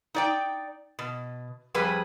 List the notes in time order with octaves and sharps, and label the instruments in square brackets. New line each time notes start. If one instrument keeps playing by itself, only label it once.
[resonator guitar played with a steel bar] D#4 D5 G5
B2
F2 G3 G#4 B4